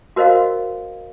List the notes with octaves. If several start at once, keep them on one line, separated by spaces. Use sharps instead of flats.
F#4 A#4 C5 D#5 F5